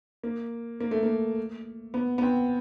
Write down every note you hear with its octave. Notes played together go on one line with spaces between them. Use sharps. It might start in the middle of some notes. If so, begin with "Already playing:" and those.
A#3
A#3
A3
A#3
B3
B3
C4